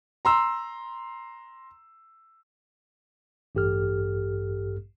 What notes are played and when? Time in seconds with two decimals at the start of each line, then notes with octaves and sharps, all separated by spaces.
0.25 A#5 C6 E6
3.55 A1 G2 G4 A4 F6